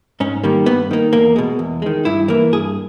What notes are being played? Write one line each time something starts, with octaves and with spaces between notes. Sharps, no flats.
G#2 C#4
D#3 G3 A#3
G2 B3
D#3 A#3
E2 A#3
B2 G#3
E2
D#3 G#3
G2 E4
E3 A#3
G2 G#4